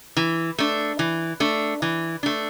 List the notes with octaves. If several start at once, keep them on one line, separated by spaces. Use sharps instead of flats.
E3
A3 D4
E3
A3 D4
E3
A3 D4